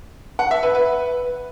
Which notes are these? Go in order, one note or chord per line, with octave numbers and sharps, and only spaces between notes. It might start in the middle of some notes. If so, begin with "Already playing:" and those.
F#5
E5
B4
B4